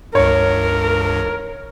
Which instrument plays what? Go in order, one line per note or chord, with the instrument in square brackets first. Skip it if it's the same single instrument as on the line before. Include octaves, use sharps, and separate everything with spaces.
[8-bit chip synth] C#2 G2 [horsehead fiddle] A#4 [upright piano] C#5